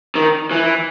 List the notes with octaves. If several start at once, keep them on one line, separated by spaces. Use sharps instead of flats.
D#3
E3